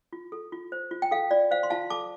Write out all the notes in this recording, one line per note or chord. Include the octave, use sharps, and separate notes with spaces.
F4
A4
F4
C5
F4
G5
A4 F5
F4 D5
C5 F5
C6
F4 F5 A5
A4 A5 D6